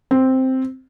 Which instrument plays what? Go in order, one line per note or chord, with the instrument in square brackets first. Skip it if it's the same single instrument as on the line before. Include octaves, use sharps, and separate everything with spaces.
[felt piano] C4